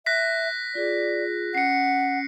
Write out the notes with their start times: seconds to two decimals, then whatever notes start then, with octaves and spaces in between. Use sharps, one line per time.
0.06 E5 F#6 A#6 B6
0.75 F4 G#4 D5
1.55 C#4 F#5 C7 C#7